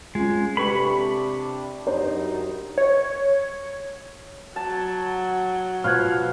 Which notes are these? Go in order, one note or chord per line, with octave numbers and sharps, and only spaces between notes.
G#3 C#4 F4
C3 D4 G4 A4 B4 B5 C#6
F#2 D4 D#4 G4 C5
C#5
F#3 A5
B2 F3 F5 B5 C#6 F#6 G#6